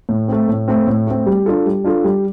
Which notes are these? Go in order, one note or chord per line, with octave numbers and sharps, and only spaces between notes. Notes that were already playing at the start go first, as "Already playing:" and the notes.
A2
A3 C4
A2
A3 C4
A2
A3 C4
G3
D4 F4 A4
G3
D4 F4 A4
G3